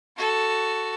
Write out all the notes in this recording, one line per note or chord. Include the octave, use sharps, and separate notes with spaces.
F#4 A4